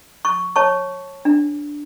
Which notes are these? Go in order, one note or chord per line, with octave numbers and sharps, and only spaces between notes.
C#6
C#5 A5 C#6
D4